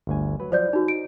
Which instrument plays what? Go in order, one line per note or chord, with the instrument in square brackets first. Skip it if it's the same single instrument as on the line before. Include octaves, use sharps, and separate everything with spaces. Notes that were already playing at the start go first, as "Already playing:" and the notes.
[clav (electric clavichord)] G1 D2 G#5
F#3 B4
[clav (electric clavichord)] F3 F#3 [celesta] C5 D5 G6
[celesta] D#4 F#4 [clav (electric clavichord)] A#4
[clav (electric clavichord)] D#4 [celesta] D7